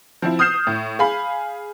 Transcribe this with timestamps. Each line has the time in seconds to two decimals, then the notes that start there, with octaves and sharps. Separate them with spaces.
0.22 F3 C4 E4
0.39 D#6 F6 G6 C7 E7
0.67 A2
0.99 G#4 F5 B5